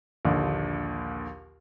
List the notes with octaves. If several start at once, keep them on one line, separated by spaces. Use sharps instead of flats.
A#1 D#2 D3